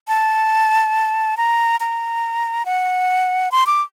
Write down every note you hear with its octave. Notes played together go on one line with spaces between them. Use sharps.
A5
A#5
A#5
F#5
C6
D6